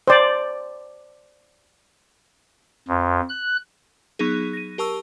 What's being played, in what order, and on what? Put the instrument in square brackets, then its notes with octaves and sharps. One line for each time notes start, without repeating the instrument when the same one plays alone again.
[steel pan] C5 D5
[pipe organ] F2
F#6
[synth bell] F#3 B3 D#4 G#4
A#6 D#7
G4 A#4 A5 C#6 E6